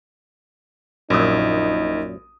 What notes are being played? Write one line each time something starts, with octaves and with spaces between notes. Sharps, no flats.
A#1 F#2 A#2 D#4 D#6